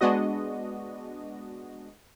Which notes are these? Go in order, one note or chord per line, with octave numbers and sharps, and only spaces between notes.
G#3 B3 D4 F#4 D#5